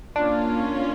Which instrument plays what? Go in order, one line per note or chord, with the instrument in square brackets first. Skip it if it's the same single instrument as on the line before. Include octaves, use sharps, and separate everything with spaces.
[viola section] A#3 C#4 F4 [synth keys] D4